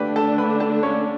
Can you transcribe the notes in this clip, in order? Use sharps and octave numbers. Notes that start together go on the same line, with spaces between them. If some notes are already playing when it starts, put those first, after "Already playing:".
Already playing: D3 A3 D4 G4 B4 B5
A4 A5
B4 B5
A4 A5
C#4 C#5